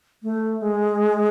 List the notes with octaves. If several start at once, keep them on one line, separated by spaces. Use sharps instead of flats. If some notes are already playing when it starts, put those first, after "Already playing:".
A3
G#3